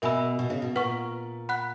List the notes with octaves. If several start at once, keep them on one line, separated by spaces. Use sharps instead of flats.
B2 A#4 E5 G#5 B5 E6
B2
C#3
B2
A#2 B4 F#5 C#6
F#5 B5 F#6